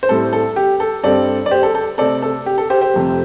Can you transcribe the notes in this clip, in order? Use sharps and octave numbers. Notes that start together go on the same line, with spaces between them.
C5
A2 G3 C4 A4
A4
G4
A4
G2 G3 C4 A4 D5
D5
G4 C5
A4
A4
C3 A3 C4 A4 D5
A4
G4
A4
G4 C5
G4 C5
F2 C3 A3